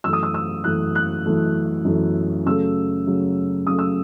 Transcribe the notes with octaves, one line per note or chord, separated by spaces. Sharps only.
F#2 E3 A3 E6
D#6
E6
E6
F#2 E3 A3 F#6
F#6
F#2 E3 A3
F#2 E3 A3
C#3 F#3 A3 E6
C#3 F#3 A3
C#3 F#3 A3 D#6
E6